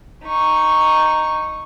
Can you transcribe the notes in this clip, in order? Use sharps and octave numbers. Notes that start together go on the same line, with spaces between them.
D#4 C#6